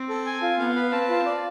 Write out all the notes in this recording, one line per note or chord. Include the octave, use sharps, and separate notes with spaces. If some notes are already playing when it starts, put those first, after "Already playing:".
Already playing: C4
A4
G#5
F4
B3 F5
B4
C4 A5
F4
D5